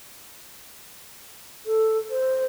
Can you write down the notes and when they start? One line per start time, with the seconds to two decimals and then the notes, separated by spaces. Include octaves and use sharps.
1.66 A4
2.10 C5